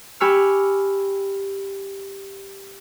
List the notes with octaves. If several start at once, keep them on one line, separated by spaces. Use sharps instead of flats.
G4 G#5 B5 C#6 E6 F6